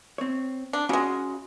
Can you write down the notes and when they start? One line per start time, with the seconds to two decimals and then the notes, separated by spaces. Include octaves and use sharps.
0.18 C4 C#5
0.73 D4
0.89 C#3 G#3 C#4 F#4